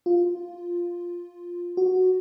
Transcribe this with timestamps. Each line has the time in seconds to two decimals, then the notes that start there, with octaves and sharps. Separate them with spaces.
0.06 F4
1.77 F#4